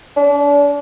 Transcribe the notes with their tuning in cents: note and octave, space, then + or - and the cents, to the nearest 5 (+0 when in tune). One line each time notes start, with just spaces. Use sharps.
D4 -35